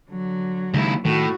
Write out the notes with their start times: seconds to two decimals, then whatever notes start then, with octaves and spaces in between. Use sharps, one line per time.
0.11 D3 F#3
0.74 D#2 C#3 G#3 E4
1.05 A2 D#3 F#4